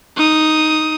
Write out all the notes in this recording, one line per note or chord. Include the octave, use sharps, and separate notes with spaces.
D#4 D#6